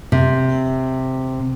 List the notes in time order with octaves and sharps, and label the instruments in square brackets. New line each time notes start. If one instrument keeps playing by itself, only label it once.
[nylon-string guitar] C3